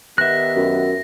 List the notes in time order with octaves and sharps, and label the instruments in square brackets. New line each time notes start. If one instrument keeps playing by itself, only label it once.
[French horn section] D#3 B3 G4 [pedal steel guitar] E5 F#6 [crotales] A#6
[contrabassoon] F#2